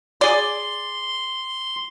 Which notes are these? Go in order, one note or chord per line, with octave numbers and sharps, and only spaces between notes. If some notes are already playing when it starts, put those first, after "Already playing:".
G#4 D5 C6